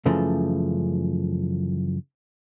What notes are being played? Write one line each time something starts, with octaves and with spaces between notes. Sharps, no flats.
F#2 C#3 E3 F3 A3